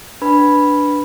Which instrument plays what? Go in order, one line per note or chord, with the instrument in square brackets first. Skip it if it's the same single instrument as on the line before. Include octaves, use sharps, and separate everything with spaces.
[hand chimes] D4 B4 B5